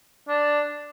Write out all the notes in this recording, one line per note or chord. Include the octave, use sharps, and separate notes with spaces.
D4